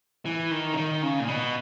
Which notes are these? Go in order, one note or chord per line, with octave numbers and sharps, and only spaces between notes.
E3
D#3
C#3
D#3
C#3
A#2
B2